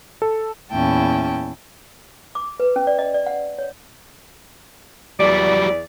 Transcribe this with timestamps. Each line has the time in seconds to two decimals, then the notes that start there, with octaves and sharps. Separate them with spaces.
0.22 A4
0.72 E2 A#2 C#4 E4 G5 A5
2.35 D6
2.60 B4
2.76 C#4
2.87 D5
2.99 D#5
3.14 D5
3.26 F#5
3.59 C#5
5.20 E2 F#3 G3 D5